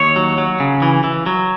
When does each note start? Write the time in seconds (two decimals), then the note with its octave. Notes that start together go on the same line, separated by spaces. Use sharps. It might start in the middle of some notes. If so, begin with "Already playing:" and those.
Already playing: D#2 C#5
0.16 F#3
0.38 F#3
0.60 C#3
0.82 E3
1.04 E3
1.26 F#3